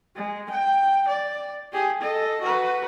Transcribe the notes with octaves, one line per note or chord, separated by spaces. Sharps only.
G#3
G5
D5
G4 G#4
A4 D#5
F#4 B4